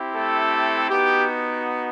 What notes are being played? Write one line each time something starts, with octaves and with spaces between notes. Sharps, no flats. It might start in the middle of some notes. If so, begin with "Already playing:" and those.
Already playing: C4 E4 G4
A3 A4
B3 D#4 F#4 G4